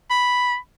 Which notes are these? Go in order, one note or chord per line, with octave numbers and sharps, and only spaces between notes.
B5